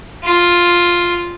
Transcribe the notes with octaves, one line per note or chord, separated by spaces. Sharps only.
F4